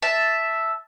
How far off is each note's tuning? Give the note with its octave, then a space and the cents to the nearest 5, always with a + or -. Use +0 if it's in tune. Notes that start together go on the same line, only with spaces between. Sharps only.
E5 +0 A5 +0